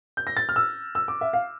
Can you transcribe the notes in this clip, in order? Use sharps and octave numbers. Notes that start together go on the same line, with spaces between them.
G6
A#6
A6
F6
E6
E6
D6
E5
F5